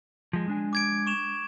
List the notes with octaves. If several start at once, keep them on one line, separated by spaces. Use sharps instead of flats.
F3 G#3
G#3 D4 G#5
D6 G#6 D7
C#6 E7 F7